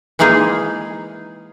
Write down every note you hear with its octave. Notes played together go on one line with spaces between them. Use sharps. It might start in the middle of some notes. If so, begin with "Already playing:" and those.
E3 G#3 A#3 D#4 G#4